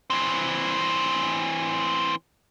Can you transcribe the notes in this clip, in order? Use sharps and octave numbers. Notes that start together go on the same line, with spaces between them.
E3 C4